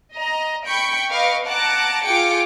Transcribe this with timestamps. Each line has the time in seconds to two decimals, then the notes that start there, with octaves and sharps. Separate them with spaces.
0.14 D#5 A#5
0.65 G5 B5 C#6 G6 D7
1.10 B4 D#5 F5 C#6 D6
1.47 F#5 A5 A#5 D6 F#6
2.03 F4 G#4 G5 D6 C#7 D7